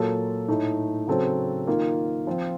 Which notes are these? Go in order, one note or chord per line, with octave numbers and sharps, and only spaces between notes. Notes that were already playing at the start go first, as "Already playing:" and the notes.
Already playing: A#2 F#3 A#3 F4 A4
A2 A3 D#4
C#3 F#3 C4 F#4 A4
D#3 A#3 F4
F3 C4 F4